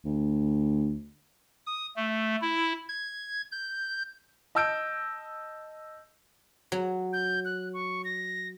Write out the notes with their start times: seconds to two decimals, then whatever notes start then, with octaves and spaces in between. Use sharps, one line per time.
0.05 D2
1.66 D#6
1.96 A3
2.41 E4
2.89 G#6
3.52 G6
4.55 D#5 A5 E6 G6 D7
6.72 F#3
7.13 G6
7.45 F#6
7.74 C#6
8.05 A#6